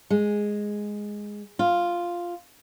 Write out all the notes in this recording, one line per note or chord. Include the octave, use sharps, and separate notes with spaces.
G#3
F4